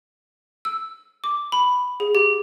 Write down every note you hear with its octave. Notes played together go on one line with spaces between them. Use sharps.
E6
D6
B5
G#4
G4